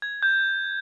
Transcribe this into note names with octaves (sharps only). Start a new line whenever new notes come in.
G#6
G6